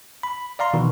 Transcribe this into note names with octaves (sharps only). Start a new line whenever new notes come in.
B5
D5 F5 A#5 C6
B2 D#3 E3